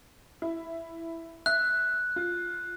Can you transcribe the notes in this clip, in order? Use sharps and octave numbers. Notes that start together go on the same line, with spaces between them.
E4
E5 F#6
F4